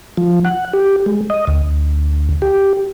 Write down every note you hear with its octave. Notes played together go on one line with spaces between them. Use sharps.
F3
F#5
G4
G#3
D#5
D2
G4